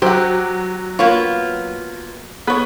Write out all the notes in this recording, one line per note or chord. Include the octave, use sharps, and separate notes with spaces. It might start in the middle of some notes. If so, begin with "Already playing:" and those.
F#3 G4 C5 F#5
A#3 B3 F4 C#5
B3 B4 C#5